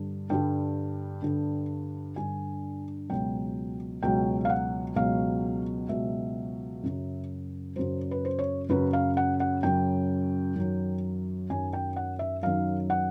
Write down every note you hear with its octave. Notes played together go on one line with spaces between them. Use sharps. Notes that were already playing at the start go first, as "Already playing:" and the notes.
Already playing: G2 D3 G3
G2 D3 G3 G5
G2 D3 G3
G2 D3 G3 G#5
C#2 B2 F#3 G5
C#2 B2 F#3 G5
F5
F#5
C#2 B2 F#3 F5
C#2 B2 F#3 E5
F#2 C#3 F#3
F#2 C#3 F#3 C5
B4
C5
C#5
F#2 C#3 F#3 B4
F5
F#5
F#5
F#2 C#3 F#3 G5
F#2 D#3 F#3
F#2 D#3 F#3 G#5
G5
F#5
E5
F#2 D#3 F#3 F5
F#5